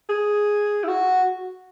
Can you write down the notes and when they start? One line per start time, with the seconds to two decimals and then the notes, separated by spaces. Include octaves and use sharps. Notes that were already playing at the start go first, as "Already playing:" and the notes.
0.09 G#4
0.84 E4
0.88 F#4